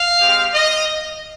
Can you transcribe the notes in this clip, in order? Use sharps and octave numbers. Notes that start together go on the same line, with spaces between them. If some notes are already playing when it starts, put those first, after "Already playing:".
Already playing: F5
G#3 C4 G4
D#5